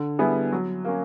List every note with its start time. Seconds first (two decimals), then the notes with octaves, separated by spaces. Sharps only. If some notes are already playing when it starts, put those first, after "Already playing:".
Already playing: D3
0.19 G3 B3 E4 G#4
0.52 F#3
0.85 A#3 C#4